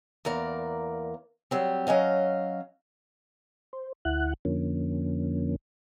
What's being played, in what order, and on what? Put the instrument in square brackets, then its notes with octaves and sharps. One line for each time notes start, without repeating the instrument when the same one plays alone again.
[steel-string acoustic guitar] E2 A#3 A#4 D5
F#3 G3 C4
F#3 C#4 D#5 F5
[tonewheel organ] C5
D2 E4 F#5 F#6
F2 D3 F3 A#3 C#4